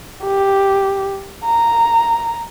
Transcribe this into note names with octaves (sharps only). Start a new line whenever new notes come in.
G4
A#5